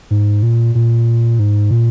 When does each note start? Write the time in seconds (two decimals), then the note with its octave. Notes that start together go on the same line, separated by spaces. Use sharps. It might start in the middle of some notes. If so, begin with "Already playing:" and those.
0.11 G#2
0.43 A#2
0.75 A#2
1.39 G#2
1.71 A#2